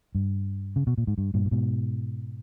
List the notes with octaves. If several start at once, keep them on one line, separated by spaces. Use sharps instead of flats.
G2
C#3
B2
A#2
G#2
G2
G2 A#2
A#2
G#2 B2